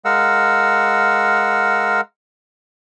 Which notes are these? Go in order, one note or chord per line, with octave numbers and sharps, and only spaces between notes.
G#3 A#4 F5 F#5 E6